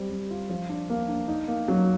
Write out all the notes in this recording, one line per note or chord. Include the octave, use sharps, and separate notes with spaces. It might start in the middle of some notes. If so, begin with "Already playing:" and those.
Already playing: G3 C4
G3
F4
F3
D4
A#3
D4
D#4
A#3
F#3